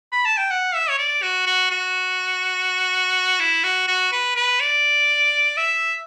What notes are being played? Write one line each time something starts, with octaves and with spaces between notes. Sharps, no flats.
B5
A5
G5
F#5
E5
C#5
D5
F#4
F#4
F#4
E4
F#4
F#4
B4
B4
D5
E5